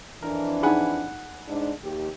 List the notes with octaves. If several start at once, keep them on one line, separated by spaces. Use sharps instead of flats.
F2 E3 D4 A#4
D#4 G#4 F#5 G#5 B5
G#2 D4
D#2 G4